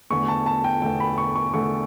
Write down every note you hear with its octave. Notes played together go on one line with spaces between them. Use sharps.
E2 D3 A3 C#6
A5
A5
G5
E2 D3 A3 G5
B5
C#6
C#6
E2 D3 A3 C#6